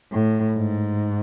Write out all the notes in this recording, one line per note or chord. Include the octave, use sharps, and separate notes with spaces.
A2
G#2